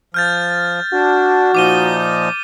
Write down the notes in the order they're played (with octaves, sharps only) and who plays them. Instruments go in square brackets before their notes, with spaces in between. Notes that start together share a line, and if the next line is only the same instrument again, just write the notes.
[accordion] F3 [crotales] F6 G6 A6
[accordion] D4 [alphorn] F#4
[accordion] A#2 F3 D#4 [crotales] D6 D#7 G7